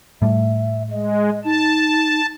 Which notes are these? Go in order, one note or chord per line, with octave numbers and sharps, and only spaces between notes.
A2 G3 A3 E5
G#3 D#5
D#4 A5